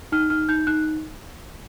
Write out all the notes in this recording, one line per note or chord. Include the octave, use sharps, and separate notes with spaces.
D#4 F6
D#4 F6
D#4 G6
D#4 F#6